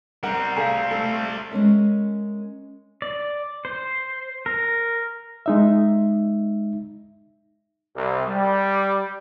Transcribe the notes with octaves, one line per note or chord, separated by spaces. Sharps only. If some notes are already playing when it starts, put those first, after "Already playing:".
G3 C4 A#4 F#5
A3 G#4 F5 A#5
A3 A4
G#3 C#4 A#4 E5
D5
C5
A#4
G#3 D#4 E5
C2
G3